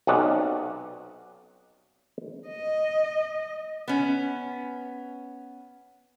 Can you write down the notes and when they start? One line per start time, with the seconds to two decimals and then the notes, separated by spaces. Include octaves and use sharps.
0.07 B1 C3 C#4 D5 D#5 F#5
2.48 D#5
3.88 B3 C#4